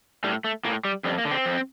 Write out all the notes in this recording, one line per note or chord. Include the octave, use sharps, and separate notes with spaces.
A2 G3
A3
A2 A#3
G3
F2 G3
A#3
D3
C4
F2